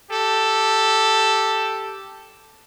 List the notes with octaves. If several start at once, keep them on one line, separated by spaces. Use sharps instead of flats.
G4 A4